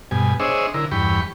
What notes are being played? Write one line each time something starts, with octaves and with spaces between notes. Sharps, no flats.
G2 B2 G#5
D4 G#4 C5 C#5 D#5 E5
D3 E4 A#4
E2 G2 G5 B5 C#6